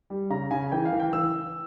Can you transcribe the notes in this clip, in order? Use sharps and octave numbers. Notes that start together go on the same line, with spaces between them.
G3
C#3 A#5
C#3 G#5
E3 G5
F5
E3
G5
E3 E6